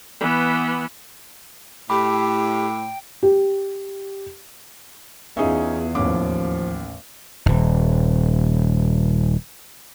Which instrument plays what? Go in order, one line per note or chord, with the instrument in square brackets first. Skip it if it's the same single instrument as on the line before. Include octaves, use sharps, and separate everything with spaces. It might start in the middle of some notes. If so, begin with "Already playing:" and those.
[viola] E3 B3
[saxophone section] A2 [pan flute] G4 [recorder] G5 [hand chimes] B5 D6
[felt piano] G4
[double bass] E2 [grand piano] C#4 D#4 [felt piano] F4 G#4 E5
[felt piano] A1 C#4 D6 [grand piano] D#2 [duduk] F3
[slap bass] D#1 G#1